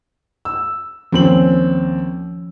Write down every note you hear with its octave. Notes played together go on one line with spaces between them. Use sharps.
E6
D#2 F3 C4 C#4 F#7